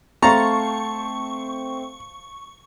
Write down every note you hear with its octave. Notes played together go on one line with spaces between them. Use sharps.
A3 C4 C5 F5 A5 A#5 C#6